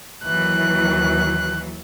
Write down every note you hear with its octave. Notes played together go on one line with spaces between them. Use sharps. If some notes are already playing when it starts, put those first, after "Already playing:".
D#2 E3 F#3 F#6